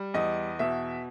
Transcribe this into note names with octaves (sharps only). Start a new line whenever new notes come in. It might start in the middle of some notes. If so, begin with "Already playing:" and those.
Already playing: G3
E2 D#5
B2 E5